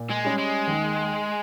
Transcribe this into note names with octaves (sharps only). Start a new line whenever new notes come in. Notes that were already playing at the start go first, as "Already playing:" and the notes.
Already playing: A#2
G#3
G3 C#4 G4
G#3
D#2